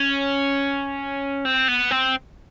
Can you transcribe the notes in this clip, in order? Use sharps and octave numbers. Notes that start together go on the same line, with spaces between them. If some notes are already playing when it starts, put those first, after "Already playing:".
Already playing: C#4
C4
B3
C4